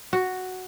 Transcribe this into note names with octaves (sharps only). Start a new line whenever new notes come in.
F#4